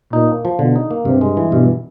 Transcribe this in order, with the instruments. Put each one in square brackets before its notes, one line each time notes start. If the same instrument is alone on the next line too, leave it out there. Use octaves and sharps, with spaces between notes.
[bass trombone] A#2 [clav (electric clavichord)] D#4
[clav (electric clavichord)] A#3
F3
[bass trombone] B2 [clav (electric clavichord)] D3
[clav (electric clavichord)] D#4
A#3
[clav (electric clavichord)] G2 [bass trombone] C3
[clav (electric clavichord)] G#3
E3
[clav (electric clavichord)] G2 [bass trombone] B2